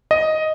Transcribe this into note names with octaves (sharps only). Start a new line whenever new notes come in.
D#5